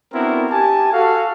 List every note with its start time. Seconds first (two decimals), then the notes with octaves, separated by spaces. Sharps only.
0.12 B3 C4 D4 E4 F#4 A#4
0.50 G4 G#5 A5
0.93 F#4 A4 F5